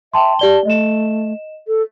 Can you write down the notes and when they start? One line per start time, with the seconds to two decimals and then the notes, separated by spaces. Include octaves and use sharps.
0.14 E5 G5 A5 C6
0.39 G4 D5 A5 G7
0.65 A3 D#5 E7
1.67 A4